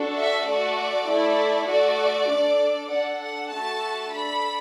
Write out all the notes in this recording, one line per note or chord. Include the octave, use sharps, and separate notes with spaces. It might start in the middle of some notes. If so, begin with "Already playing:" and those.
Already playing: D4 F#4 A4
E5
A3 F#4 A4 D5
A3 E4 A4
A3 F#4 A4 D5
D4 A4
D4 A4 F#5
F#5
A3 F#4 A4 A5
D4 A4 B5